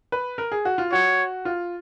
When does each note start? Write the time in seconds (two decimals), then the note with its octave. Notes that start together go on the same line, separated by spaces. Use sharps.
0.12 B4
0.38 A#4
0.52 G#4
0.65 F#4
0.78 F4
0.92 F#4 C#5
1.45 F4